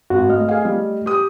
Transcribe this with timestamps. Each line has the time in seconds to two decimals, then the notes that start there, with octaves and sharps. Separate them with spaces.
0.10 G#1 F#4
0.29 A3 D#5 F6
0.49 G#4 F5
0.65 G3
1.06 G4 D#6